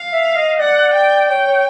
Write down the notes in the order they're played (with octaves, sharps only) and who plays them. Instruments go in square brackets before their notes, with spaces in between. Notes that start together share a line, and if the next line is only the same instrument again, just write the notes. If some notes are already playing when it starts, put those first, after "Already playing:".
Already playing: [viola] F5
[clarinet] E5
D#5
[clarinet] D5 [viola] F#5
[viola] G5
[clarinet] C#5 [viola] G5
[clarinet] C#5